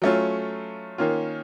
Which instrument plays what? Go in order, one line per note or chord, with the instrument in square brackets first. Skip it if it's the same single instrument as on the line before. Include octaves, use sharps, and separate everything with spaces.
[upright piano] F#3 A3 C#4 F4
D#3 A#3 C#4 F4